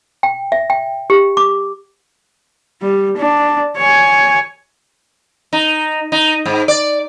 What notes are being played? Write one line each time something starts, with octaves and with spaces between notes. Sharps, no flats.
G5
E5
G5
G4
D6
G3
D4
C#5 G#5
D#4
D#4
G#2
D5